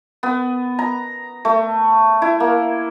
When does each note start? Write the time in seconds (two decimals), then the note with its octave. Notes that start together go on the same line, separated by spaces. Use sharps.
0.23 B3
0.79 A#5
1.45 A3
2.22 E4
2.40 A#3